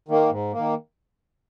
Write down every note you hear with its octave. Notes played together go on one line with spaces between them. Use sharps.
D#3 A#3
G#2
D#3 A#3